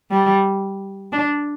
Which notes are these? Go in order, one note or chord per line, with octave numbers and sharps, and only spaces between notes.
G3
D4